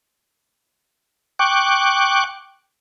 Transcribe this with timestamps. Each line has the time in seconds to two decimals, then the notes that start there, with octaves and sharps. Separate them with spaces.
1.39 G5 C#6 D6 F#6